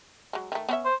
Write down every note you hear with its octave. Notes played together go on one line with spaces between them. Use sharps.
F#3 G#3
D#3 A3
B3 C#4 E5
C5